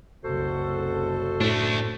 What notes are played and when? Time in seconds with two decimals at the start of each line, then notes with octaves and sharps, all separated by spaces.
0.25 F#1 C2 C#3 F#4 A4 C5
1.40 A2 A3 D4